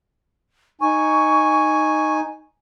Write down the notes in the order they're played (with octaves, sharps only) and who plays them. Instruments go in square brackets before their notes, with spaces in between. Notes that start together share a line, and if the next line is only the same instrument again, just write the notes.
[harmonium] D#4 G#5 [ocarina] C#6